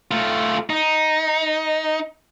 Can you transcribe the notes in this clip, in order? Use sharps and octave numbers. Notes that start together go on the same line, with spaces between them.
A3 F4
D#4